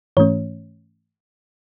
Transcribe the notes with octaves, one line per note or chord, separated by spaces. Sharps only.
G#2 E3 A3 C#4 C#5